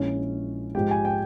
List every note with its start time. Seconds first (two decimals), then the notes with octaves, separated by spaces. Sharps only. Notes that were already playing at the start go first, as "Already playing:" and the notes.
Already playing: A#1 A#2 G#3 C#4 E4 C#5
0.75 G#2 F3 G#3 G4 G5
0.91 G#5
1.05 G5